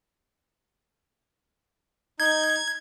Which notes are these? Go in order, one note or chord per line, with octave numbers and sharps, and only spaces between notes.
D#4 G6 G#6